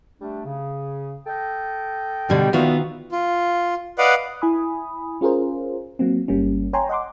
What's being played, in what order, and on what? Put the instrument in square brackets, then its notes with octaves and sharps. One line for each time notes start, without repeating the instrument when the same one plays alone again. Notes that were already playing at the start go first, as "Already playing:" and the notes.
[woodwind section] G3 A3 D4
C#3
A4 D#5 G5
[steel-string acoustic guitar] B2 G3 [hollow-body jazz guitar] D3
[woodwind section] F2 D5 E5 [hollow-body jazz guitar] D#3 F4 F#4 [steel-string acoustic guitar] B3
[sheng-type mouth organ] F4
B4 D5 D#5 F5 F#5
[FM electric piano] E4 G#5 B5 D#6
C#4 F4 G#4 A#4 C5
F#3 A#3 C4
G1 G3 A#3 C#4
C#5 G5 G#5 A#5 C6
D#5 F#5 C6 D6